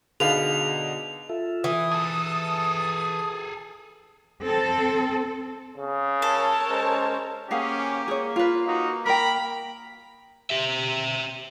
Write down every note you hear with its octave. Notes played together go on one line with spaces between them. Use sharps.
B2 D3 D#4 G#4 B4 F5 F7
F4 A4 E5
E3 D#6
G#4 A4 A5
C4 A4
C#3
A4 A#4 C#5 A5
G#3 C#4 C5 A#5
A#3 C#4 G4 G#4 F5 F#5
G#4 C#5
F4 B4 F5
D#4 F#4
A#4 G5 A#5 B5
G4 E5